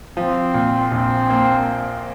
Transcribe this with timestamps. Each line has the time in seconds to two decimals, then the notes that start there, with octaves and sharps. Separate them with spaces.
0.17 F3 C4
0.54 A#2
0.92 A#1 C4
1.30 A#3